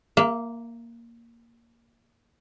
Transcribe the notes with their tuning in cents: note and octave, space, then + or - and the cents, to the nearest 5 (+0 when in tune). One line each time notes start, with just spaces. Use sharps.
A#3 +0 E5 +35